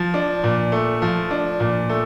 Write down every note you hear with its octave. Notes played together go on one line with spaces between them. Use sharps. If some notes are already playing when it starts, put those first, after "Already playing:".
Already playing: F3
D4
A#2
A3
F3
D4
A#2
A3